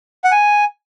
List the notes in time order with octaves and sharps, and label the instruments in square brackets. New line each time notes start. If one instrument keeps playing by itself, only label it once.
[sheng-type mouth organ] F#5
G#5